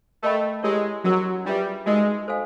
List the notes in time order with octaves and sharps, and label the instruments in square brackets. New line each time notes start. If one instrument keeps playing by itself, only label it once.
[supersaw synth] A3 [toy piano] A#4 D#5 G5 B5
[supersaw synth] G#3 [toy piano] E4 G4 A#4 C#5
[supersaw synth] F#3 [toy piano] C#4 F#4 A#4
[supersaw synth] G3 [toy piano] D4 F4 G#4 B4 E5
[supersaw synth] G#3 [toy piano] D#4 F#4 A#4 D#5 G#5
[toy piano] A4 C5 F5 G#5